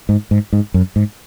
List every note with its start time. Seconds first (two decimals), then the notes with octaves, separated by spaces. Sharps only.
0.09 G#2
0.31 G#2
0.53 G#2
0.74 F#2
0.96 G#2